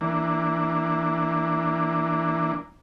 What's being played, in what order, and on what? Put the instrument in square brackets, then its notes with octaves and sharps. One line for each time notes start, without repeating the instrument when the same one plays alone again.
[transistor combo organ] E3 A#3 D4